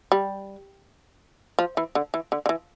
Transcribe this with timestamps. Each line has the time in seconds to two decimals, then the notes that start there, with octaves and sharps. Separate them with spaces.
0.12 G3
1.59 F3
1.77 E3
1.95 D3
2.14 E3
2.32 D3
2.46 D3
2.49 E3